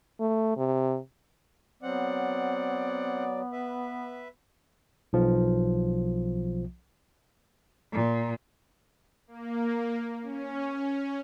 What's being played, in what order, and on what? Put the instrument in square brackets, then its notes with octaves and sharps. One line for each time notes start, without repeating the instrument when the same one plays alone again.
[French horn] A3
C3
[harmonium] F#3 [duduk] B3 [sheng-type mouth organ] C4 F#5 [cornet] D5
[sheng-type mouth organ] B4 E5
[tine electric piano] B1 F3
[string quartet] A#2
[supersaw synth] A#3
C#4